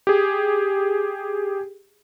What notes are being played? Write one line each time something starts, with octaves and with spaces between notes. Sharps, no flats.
G4 G#4